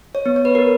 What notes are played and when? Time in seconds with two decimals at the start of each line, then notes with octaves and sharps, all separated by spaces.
0.15 C#5
0.26 B3
0.36 C#5
0.45 B4
0.55 B3 A#4